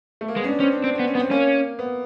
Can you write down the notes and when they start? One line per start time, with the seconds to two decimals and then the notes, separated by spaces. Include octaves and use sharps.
0.21 A3
0.28 A#3
0.36 G#3 B3
0.44 C#4
0.48 D4
0.60 C4 C#4
0.72 D4
0.83 C4 D4
0.95 B3 C4
1.07 C#4
1.15 B3
1.19 C4
1.31 A#3 C#4
1.79 B3